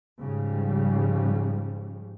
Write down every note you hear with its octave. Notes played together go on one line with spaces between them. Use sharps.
G#2 C#3 F3 G3